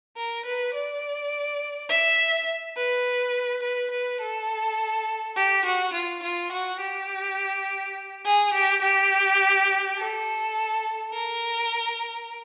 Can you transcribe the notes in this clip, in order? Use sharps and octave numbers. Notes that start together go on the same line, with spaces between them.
A#4
B4
D5
E5
B4
B4
B4
A4
G4
F#4
F4
F4
F#4
G4
G#4
G4
G4
A4
A#4